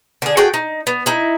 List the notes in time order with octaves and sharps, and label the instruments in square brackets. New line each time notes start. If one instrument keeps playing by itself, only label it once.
[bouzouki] D3 G#4
F#4 G#4 A4 G5
D#4
B3
D#4 E4